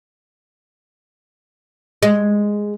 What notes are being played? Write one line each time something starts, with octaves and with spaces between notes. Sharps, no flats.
G#3